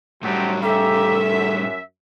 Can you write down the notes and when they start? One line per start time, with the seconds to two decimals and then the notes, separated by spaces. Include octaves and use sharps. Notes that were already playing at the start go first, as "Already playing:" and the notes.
0.23 F#2 A2 F#3 G3 A3 C4 G4
0.63 C#3 G4 A4 E5 A#5
1.29 F#2